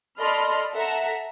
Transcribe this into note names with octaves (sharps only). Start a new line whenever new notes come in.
A4 D5 D#5 B5 C6 F6
A4 E5 F#5 A#5